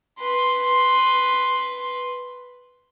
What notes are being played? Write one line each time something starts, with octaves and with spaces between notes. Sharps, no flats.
B4 C6